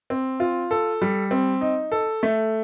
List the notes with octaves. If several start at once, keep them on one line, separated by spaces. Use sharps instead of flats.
C4
F4
A4
G3
C4
D#4
A4
A3